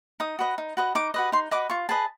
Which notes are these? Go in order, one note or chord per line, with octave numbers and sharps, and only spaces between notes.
D#4 D#6
F#4 B4 D#5
D#4
F#4 B4 D#5
D#4 D6
F#4 B4 D#5
D#4 C6
F#4 B4 D#5 D6
F4 C#6
G#4 B4 D#5 A5